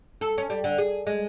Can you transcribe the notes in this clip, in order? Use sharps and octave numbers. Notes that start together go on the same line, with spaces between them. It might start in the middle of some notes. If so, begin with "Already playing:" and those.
A4
C#4
G3
D3
G#4
G#3